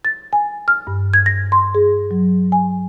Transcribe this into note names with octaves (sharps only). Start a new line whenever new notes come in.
A6
G#5
F6
G2
G#6
A#6
C6
G#4
F#3
G#5